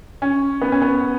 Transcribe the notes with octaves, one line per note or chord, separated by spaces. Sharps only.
C#4
B3
C#4
B3